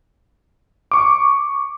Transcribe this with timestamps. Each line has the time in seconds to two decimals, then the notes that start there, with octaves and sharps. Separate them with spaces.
0.91 C#6 D6